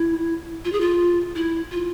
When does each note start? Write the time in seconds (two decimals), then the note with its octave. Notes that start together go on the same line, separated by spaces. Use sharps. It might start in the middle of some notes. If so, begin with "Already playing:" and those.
Already playing: E4
0.65 F4
0.72 G#4
0.80 F4
1.35 E4
1.71 F4